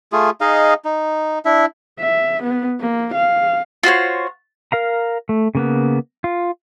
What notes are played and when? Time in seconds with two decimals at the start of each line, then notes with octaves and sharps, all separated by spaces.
0.12 A3 F4 G#4
0.41 D#4 G#4 D#5 F5
0.85 D#4
1.45 D4 E4 E5
2.00 E5
2.43 B3
2.80 A#3
3.15 F5
3.83 F4 F#4 C5 C#5
4.72 A#4 F5 A#5
5.29 A3
5.55 C#3 A#3 B3
6.24 F4